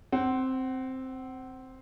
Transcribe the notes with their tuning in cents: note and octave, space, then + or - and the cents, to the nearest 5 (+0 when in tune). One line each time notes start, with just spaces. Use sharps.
C4 +0 F#5 +35